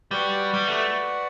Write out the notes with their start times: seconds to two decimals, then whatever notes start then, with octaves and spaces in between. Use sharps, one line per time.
0.11 G3 F#4 B4 D5 F#5
0.54 G3
0.68 A3